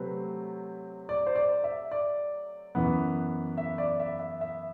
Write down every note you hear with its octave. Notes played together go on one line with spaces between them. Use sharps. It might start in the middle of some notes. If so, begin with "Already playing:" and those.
Already playing: C3 F#3 A3 C4 B4
D5
C5
D5
E5
D5
F#2 E3 B3
E5
D5
E5
E5
E5